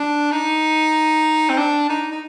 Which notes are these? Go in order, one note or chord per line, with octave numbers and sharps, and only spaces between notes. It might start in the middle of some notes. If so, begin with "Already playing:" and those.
Already playing: D4
D#4
C4
D4
D#4
D#4